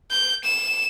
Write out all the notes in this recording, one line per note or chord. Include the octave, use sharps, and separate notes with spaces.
G6
E7